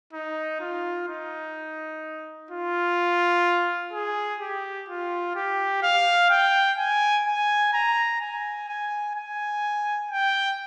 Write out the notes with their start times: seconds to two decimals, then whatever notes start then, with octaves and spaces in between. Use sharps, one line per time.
0.13 D#4
0.61 F4
1.08 D#4
2.51 F4
3.93 G#4
4.41 G4
4.89 F4
5.35 G4
5.83 F5
6.30 G5
6.78 G#5
7.26 G#5
7.74 A#5
8.21 G#5
8.69 G#5
9.15 G#5
10.11 G5